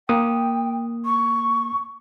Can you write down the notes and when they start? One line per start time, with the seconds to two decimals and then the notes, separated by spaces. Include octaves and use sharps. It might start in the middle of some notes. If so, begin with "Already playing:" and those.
0.09 A#3 G5 D#6
1.05 C#6